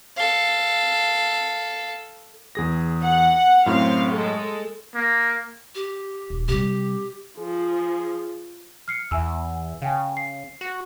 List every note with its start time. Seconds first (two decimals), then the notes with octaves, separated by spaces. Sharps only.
0.17 A4 F5
2.55 E2 G#4 A#6
3.03 F#5
3.66 F#2 A2 C4 F5 C6
4.10 G#3 A4
4.95 A#3
5.75 G4
6.30 D#1
6.48 C3 G3 G4
7.38 F3 G#4
8.88 F6 C7 C#7
9.11 E2 E5 G#5 E6
9.82 C#3 F5 G5 G#5
10.17 C7
10.61 F#4